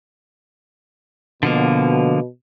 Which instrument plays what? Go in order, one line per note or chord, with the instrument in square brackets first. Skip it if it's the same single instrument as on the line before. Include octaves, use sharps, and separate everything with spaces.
[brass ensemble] B2 [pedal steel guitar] D3 F3 A#3